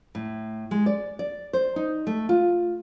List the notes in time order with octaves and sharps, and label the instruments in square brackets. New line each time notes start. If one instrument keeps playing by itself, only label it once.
[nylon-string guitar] A2
G#3
D5
D5
C5
D#4
A3
F4